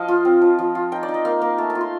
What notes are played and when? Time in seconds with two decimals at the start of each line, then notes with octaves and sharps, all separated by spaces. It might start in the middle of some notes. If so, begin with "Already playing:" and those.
Already playing: F3 D#5 F5
0.08 F4
0.25 C4
0.42 F3
0.59 F3
0.75 F4
0.92 D#4 G5
1.03 D5
1.08 D#4
1.14 D#5
1.25 A#3 F5
1.42 A#3
1.58 A3 A5
1.70 A5
1.75 F4
1.81 C6